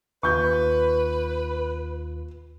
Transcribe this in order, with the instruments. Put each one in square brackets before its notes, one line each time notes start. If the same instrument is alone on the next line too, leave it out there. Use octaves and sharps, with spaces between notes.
[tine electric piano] D#2 F4 [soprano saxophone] B4 [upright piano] C#6 G6